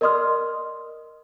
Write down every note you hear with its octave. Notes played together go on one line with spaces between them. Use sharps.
A#4 D5 D#5 C6 D#6 F6